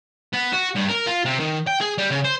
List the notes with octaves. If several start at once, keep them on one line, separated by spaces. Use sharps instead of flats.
B3
F#4
G2
A#4
F4
C3
D#3
G5
G#4
G3
C#3
C5